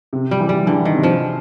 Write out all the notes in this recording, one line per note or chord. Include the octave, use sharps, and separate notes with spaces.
C3
G3
E3
G3
D3 E3
D#3
C3
F3